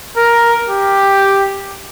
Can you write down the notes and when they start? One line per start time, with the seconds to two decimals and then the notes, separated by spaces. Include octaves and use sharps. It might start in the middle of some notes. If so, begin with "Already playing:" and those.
0.17 A#4
0.70 G4